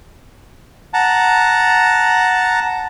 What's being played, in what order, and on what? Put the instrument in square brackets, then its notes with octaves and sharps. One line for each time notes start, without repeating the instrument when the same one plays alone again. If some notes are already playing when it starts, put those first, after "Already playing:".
[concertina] F#5 A5 A#5